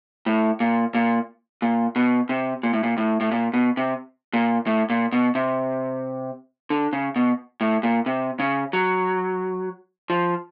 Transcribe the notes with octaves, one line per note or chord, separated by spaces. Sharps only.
A2
A#2
A#2
A#2
B2
C3
A#2
A2
A#2
A2
A2
A#2
B2
C3
A#2
A2
A#2
B2
C3
D3
C#3
B2
A2
A#2
C3
C#3
F#3
F3